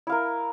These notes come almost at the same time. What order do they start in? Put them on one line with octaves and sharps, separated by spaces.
E4 F5 A#4